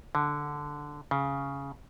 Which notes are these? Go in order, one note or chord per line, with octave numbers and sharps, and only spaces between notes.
D3
C#3